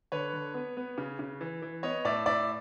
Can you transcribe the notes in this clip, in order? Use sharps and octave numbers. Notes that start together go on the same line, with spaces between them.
D3 B4 C#5
D3
B3
B3
C#3
C#3
E3
E3
B3 C#5 D#5
A2 D5 E5
A2 D5 E5